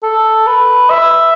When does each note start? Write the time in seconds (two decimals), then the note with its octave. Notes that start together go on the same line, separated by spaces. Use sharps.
0.03 A4
0.47 B4
0.90 E5